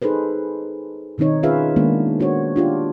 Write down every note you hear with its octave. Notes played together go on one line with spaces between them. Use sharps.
D#4 G#4 A4 B4 C5
B2 D#3 C4 D#4 C#5
C#4 F4 G#4 B4 E5 F5
D#3 G#3 A#3 B3 D4
D4 F#4 C5 C#5
D4 F4 G4